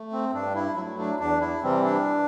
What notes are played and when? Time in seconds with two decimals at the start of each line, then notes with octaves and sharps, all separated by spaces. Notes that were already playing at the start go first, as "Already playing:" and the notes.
Already playing: A3
0.12 C4
0.33 G2 D4
0.55 E4
0.76 F#3 A3 E4
0.99 D4
1.19 E2 D4
1.41 E4
1.63 C3 E3 G3 C4
1.84 D4